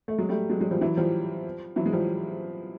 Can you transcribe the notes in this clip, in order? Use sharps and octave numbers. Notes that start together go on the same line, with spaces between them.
A3
F#3 G#3
G3 A3
F#3 G#3
F#3 G#3
F3 G3
E3 F#3
F3 G3
E3 F#3
G#3
F3 G3